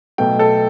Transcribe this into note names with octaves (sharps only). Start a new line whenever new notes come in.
B1 B2 A3 G5
A4